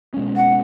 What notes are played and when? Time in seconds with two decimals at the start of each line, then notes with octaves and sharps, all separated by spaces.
0.14 B2 G#3 C#4
0.36 F#5